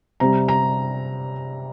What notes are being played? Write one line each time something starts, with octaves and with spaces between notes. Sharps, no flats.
C3 G3 A#5
A#5